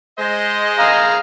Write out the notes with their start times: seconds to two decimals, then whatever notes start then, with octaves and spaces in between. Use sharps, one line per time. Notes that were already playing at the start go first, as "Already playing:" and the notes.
0.17 G#3 C5 D#5
0.79 G#4 F5 A#5